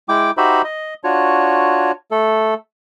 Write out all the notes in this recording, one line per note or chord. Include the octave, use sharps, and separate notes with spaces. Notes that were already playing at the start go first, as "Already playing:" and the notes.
G#3 E4 G5 D6
D#4 F#4 G4 C5 E5 B5
D#5
D4 F4 F#4 C#5
A3 A4